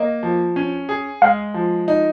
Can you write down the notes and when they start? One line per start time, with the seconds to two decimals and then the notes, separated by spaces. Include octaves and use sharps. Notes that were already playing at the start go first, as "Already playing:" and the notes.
Already playing: A#3 D#5
0.23 F3
0.56 C#4
0.89 G#4
1.22 G#3 F5
1.54 F3
1.88 D#4